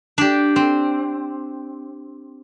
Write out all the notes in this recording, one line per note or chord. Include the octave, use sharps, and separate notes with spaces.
D4 G4
C4